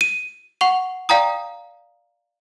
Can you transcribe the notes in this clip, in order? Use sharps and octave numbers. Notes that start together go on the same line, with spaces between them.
D#7
F#5 C#6 F7
D5 F5 G5 A#5 D#6